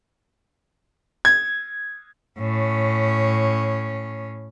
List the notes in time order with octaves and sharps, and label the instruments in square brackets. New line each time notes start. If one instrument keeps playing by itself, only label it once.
[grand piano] G#6
[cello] A2 C#4